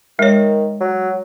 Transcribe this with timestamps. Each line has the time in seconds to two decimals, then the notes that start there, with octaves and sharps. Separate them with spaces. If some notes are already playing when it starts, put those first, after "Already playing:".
0.19 D#3 G#3 C#5
0.81 F#3